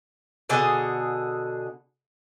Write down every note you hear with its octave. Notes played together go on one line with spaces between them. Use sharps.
B2 D3 G#4 F#5